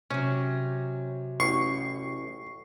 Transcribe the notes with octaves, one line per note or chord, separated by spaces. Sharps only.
C3 F#3 C#4
A1 C#6 C7